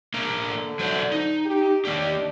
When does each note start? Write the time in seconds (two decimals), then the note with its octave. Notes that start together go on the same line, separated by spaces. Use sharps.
0.14 A#3 D4 A#4
0.46 D3
0.79 F#3 C5 D5
1.12 D#4
1.45 G4
1.85 D#3 A#3 D4 G4